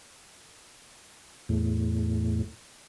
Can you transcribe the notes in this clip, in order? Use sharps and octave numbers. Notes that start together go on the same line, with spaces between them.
E2 A2